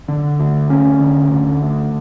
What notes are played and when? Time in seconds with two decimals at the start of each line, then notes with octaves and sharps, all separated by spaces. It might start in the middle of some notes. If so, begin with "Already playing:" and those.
0.08 D3
0.40 D2
0.69 D2 C#4
1.00 D3
1.31 D3
1.62 D2